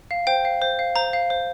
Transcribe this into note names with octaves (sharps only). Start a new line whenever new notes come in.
F5
C5 G5
F5
C5
F5
C5 A#5
F5
C5